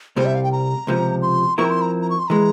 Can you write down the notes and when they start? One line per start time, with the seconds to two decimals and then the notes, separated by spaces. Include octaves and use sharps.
0.16 C2 C3 G3 C5
0.26 E5
0.35 F5
0.43 G5
0.52 A#5
0.87 C#2 C3 F3
1.22 C6
1.58 F3 C4 E4 A#4 C#6
1.65 A#5
1.70 C6
1.81 A#5
2.01 A#5
2.10 C#6
2.19 C6
2.28 E3 G#3 A#5